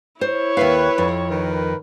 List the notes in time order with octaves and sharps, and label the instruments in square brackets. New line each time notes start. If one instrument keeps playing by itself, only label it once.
[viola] E4 C#5 [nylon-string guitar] C5
[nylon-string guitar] D#2 E5 F5 [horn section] B4
[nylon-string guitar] F2
[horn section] D#3 A#4 B4